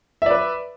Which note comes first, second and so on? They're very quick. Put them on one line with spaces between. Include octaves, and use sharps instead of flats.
E5 D5 B4